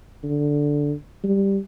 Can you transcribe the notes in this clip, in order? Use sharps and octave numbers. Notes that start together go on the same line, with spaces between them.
D3
G3